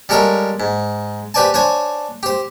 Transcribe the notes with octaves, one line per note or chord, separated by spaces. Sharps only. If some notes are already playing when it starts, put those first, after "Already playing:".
G3 G#3 A4 A#4 C#5 F5
G#2
G4 B4 C5 D5 G#5 A5
D4 C5 C#5 G#5
G4 C5